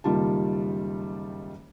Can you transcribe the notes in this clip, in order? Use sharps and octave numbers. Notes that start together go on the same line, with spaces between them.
F#1 D#3 G3 F4 A5